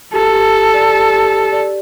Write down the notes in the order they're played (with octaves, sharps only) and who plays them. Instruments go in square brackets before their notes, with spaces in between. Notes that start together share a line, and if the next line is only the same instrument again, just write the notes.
[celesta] G4 [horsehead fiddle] A4
[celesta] G4
G4
D5
G4
G4
G4
D5